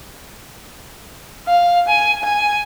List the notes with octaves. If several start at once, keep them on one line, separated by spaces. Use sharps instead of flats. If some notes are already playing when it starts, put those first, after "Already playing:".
F5
G#5
G#5